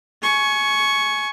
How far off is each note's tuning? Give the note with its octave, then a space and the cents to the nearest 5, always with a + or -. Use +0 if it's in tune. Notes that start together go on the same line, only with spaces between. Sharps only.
G#5 +25 C#6 +0